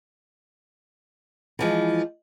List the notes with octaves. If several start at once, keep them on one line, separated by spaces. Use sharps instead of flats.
E3 F3 G#3